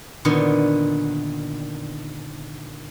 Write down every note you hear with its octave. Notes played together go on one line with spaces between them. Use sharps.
A#2 D3 D#3 B3